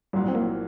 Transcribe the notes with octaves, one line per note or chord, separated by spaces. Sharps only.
C2 A#2 F#3 G3
C4
A#3